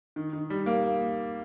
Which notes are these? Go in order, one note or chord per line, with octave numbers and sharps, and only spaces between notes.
D#3
D#3
G3
A#3